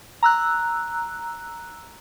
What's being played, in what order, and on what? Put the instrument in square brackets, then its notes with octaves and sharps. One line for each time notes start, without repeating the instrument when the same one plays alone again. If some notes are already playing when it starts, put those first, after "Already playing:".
[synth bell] A#5 E6 F#6